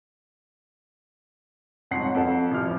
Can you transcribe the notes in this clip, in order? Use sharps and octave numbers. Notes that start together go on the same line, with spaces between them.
F2 G#2 C#5 F#5 C7
F2 A4
A1 F3 E4 F6